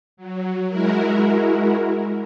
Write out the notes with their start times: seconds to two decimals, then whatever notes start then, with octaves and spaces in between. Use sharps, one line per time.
0.17 F#3
0.69 G#3 E4 F#4 A#4